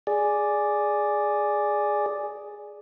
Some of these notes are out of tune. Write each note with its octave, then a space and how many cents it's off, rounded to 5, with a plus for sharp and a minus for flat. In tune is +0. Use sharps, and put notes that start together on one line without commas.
G#4 +0 D5 +0